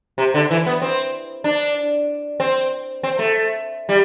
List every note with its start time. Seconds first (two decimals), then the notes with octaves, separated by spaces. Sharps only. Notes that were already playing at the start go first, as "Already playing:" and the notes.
0.18 C3
0.34 D3
0.51 E3
0.66 B3
0.82 C4
1.44 D4
2.40 C4
3.03 C4
3.19 A3
3.89 G3